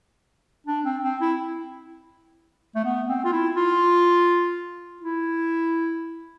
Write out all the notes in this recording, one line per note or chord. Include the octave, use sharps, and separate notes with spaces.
D4
C4
C4
E4
A3
B3
C4
F4
E4
F4
E4